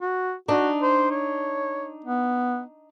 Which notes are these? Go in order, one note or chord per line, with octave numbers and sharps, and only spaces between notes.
F#4
D4 D#4 F#4
C5
C#5
B3